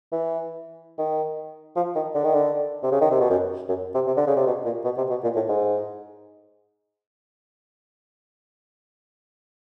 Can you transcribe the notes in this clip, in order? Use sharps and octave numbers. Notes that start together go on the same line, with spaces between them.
E3
D#3
F3
D#3
D3
D#3
D3
C3
C#3
D#3
C3
B2
F#2
F#2
C3
C3
D3
C#3
C3
B2
A#2
B2
C3
B2
A#2
A2
G#2